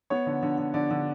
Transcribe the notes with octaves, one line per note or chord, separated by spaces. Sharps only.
B3 C#5
D3
D3
D3
D3 D5
D3